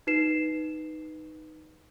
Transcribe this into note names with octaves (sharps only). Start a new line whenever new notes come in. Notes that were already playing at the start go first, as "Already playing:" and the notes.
D#4 B4 C7 E7